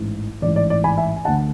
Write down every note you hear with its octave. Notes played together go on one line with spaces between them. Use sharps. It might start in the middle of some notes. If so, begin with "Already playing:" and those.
Already playing: A1 G#2 E3
A1 G#2 E3 D5
D5
D5
G#5 B5
E5 G#5
G#5
D2 D3 F#5 A5